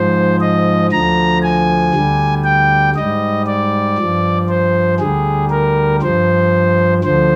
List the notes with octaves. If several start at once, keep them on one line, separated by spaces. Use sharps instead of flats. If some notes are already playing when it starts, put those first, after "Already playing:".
Already playing: G#2 F3 C5
D#5
D2 D3 F3 A#5
G#5
D2 D3 G3
G5
G#2 G3 D#5
D5
G2 F3
C5
D2 D3 G3 G#4
A#4
G2 F3 C5
D2 D3 F3 C5